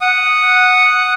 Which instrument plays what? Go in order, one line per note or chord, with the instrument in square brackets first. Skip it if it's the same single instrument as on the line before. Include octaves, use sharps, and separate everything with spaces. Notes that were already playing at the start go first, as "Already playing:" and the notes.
[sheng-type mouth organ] F#5 D#6